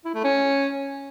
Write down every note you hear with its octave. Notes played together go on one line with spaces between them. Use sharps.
E4
A3
C#4